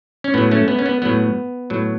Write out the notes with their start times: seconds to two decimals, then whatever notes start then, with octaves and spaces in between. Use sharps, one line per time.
0.24 C#4
0.34 A2 F#3 B3
0.51 A3 C#4
0.68 B3
0.79 C#4
0.86 B3
1.02 A2 F#3 B3
1.70 A2 F#3